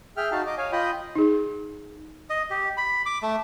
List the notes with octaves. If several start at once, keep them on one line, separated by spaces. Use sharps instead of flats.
G#4 E5 G5 F6
D#4 F#4 F5 A5
D#5 D6
C#5 F5 G#5
F4 D#5 G5 B5 D#6
D#4 G#4
D#5
G4
B5
D6
A3